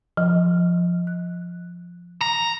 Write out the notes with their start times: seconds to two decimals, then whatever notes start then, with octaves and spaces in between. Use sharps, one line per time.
0.17 F3
1.07 F#6
2.21 A#5